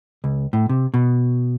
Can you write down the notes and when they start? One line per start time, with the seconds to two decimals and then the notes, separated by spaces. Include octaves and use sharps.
0.24 C#2
0.53 A2
0.69 C3
0.94 B2